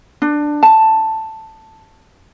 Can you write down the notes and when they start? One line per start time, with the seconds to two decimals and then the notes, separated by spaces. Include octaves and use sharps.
0.22 D4
0.63 A5